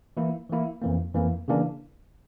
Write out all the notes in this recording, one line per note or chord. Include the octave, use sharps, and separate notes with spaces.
E3 A#3 E4
E3 A#3 E4
F2 E3 A#3
F2 E3 A#3
C#3 E3 A#3 D4